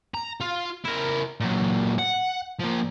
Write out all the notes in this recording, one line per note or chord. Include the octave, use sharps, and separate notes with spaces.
A#5
F4
E4 A#4
A#2 F#3
F#5
F3 A#3